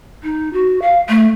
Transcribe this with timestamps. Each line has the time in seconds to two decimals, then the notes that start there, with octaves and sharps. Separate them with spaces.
0.24 D#4
0.53 F#4
0.82 F5
1.09 A3